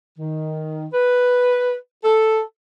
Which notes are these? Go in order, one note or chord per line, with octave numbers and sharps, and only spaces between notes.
D#3
B4
A4